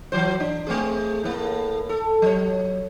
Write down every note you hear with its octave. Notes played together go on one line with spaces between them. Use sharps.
E3 F#3 C5
D4
A3 C4 G#4
A2 A#3
A4
F#3 C#5